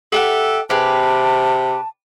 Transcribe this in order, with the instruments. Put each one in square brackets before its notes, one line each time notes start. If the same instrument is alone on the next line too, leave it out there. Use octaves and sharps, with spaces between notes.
[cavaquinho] G4 E5 F#5 [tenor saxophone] A4
[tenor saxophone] C3 [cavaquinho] G4 G#4 B4 [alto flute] A5